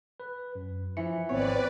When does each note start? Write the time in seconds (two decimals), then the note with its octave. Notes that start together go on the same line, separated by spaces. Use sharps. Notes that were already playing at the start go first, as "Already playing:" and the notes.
0.20 B4
0.55 F#2
0.97 E3 F3 C#7
1.29 G#1 B3 C4 B4 C#5 D5